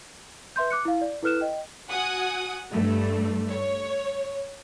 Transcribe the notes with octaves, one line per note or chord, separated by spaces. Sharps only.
B4 E5 C6 G6
D6 F#6 C#7
E4 F5
D5
E4 A4 B4 F6 F#6 E7
D#5 G5
F#4 F#5 G#5 D#6
G2 A3
C#5